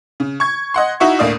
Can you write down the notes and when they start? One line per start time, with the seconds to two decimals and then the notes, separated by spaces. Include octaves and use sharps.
0.20 C#3
0.40 C#6 G#6
0.74 D#5 F#5 C6
1.00 D#4 E4 F#4 E5 F#5 C#6
1.19 D2 A2 A#3 D5 F5 D#6